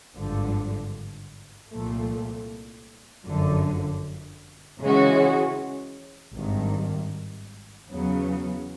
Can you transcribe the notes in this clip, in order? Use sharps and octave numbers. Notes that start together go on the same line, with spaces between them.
G#1 G2 D3 F3
C2 A#2 F3 A3
G1 F#2 D3 F3
C#3 E3 G#3 C#4 F#4
G#1 G2 D#3
E2 C#3 F#3 B3